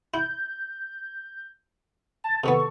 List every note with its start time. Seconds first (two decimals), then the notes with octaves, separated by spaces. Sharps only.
0.14 E4 G6
2.24 A5 A6
2.44 C3 D#3 B3 A4 C#6